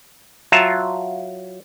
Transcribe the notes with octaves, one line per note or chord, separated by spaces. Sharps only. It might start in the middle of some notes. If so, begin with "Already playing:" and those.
F#3 F4 E5 A5 A#5